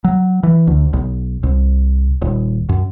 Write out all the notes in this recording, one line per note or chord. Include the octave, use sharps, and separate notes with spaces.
F#3
E3
D2
B1
C2
D#1
F#2